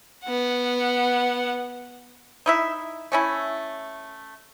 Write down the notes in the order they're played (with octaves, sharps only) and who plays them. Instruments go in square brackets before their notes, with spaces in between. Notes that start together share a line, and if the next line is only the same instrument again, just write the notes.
[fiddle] B3 F#5
[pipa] D#4 E4 E5
A3 C#4 E4